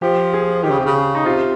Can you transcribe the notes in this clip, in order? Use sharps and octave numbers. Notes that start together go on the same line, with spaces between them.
F3 G4
G#4
D#3 G4
C#3
C3
C#3
D#4
C3 F4